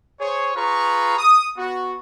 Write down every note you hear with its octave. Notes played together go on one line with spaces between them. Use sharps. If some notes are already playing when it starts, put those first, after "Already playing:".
G#4 C5 C#5
F4 G#4 B4 A#5 C#6
D#6
B3 F#4